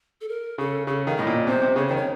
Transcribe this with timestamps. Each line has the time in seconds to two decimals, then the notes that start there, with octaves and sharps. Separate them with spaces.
0.21 A4
0.28 A#4
0.58 C#3 A4
0.87 C#3 A4
1.07 D#3 F5
1.17 A2 D#5
1.27 A#2
1.47 C3 C5
1.62 C3
1.76 C#3 C#5
1.87 D#3 C5
1.96 C#5